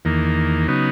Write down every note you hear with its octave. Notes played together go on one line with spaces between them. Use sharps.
E2 D#3 A#3
C#3 F#3 B3 D#4